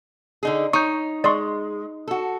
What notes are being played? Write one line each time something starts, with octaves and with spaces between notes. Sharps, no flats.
D3 D#4 G#4
D#4 C#5 C#6 G6
G#3 D5 C6 C#6
F#4 A4